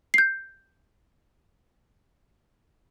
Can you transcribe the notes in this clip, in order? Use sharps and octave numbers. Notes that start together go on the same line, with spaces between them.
G6 C7